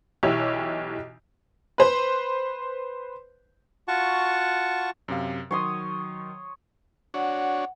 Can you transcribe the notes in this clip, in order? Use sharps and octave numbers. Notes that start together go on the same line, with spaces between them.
B1 E3 E4 G4 C#5
B4 C5
F4 F#4 F#5 A5 C#6
F#2 C3 F5
D#3 F#3 C#5 C6 D#6
D4 F#4 C#5 F#5